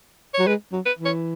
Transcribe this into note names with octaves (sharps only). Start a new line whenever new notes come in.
C#5
F#3
G#3 B4
F#3
B4
E3
C#5